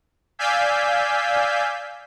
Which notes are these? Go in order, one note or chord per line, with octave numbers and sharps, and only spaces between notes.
D5 F5 G#5 E6 G6 B6